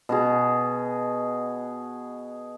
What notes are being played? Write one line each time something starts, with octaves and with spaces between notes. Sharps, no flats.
B2 F#4 G#4